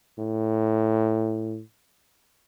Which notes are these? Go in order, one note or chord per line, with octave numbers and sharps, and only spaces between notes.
A2